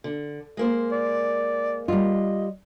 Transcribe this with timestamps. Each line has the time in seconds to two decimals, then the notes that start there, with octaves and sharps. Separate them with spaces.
0.04 D3
0.57 G#3 A#3 C5
0.92 D5
1.88 G3 F4 D#5